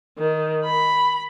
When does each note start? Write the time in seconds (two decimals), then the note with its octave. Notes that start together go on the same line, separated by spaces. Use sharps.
0.18 D#3
0.64 B5